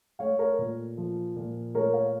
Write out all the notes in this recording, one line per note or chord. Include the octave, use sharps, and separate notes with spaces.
A3 C#5 F5
A#4 C#5
A#2
F3
A#2
A3 A#4 C#5
C#5 F5